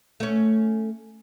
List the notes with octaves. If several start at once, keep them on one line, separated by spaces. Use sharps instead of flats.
A3 C#4